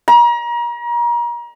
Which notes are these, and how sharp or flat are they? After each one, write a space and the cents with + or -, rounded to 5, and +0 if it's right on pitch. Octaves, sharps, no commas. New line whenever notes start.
A#5 +35